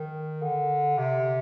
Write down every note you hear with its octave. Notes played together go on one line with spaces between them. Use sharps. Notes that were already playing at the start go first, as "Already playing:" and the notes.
Already playing: D#3
D3
C3